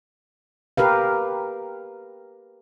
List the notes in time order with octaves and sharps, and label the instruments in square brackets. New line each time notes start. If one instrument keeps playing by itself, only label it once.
[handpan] G4 A#4 B4 F5